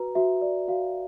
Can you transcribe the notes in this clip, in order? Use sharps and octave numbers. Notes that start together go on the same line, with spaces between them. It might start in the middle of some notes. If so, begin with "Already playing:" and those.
Already playing: F#4 B4 A#5
F#4 E5
D5
F#4 F5